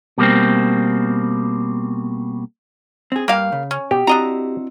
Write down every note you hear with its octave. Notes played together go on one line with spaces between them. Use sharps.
B2 G3 A#3 C4
C4 G#4
G2 A#3 G4 F5 G5
C#3
C#4
B2 G4
C4 D4 E4 F#4 D#5 A#5